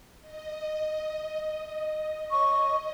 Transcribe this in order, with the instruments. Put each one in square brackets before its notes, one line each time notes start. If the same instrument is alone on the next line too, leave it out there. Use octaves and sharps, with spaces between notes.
[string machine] D#5
[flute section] C#5 C#6